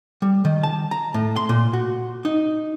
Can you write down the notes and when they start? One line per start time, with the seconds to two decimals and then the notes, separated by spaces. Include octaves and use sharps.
0.22 G3
0.45 D#3
0.63 A5
0.91 A#5
1.14 A2
1.36 C6
1.49 A#2
1.73 F#4
2.25 D#4